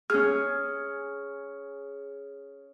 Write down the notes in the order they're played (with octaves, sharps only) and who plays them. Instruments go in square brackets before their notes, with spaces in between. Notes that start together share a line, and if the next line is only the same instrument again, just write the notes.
[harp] C#4 G#4 [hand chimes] F6